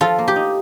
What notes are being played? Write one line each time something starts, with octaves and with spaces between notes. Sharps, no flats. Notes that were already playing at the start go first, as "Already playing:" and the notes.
F3 F4 A4
A#3
G4
D#4